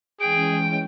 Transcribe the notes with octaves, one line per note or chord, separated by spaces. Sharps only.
E3 G#3 C#4 G#4 G5 D7